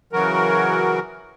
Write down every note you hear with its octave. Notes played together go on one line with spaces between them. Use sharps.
C#3 E3 F#3 F#4 A#4